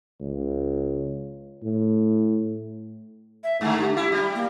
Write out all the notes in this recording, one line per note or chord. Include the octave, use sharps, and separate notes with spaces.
C#2
A2
E5
G2 D3 A3
G4
E4
G3
A#3